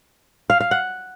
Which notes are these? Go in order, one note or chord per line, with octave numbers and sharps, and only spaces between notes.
F5
F5
F#5